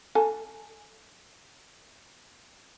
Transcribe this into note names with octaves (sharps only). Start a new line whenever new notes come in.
A4 G#5